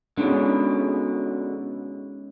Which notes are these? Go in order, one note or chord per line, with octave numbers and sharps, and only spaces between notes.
B2 D3 G#3 C#4 D#4